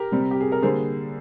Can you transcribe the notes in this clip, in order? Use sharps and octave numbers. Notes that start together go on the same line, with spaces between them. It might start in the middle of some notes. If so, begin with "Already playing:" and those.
Already playing: G4 A#4
C3 G3 C4
G4
G#4
A#4
D3 G3 A#3 G#4 C5